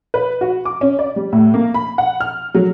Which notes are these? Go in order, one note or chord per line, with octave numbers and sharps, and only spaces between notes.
B4
F#4
D6
C#4
D5
G3
A2
A#3
B5
F#5
F6
F#3